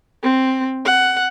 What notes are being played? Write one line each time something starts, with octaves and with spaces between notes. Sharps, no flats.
C4
F#5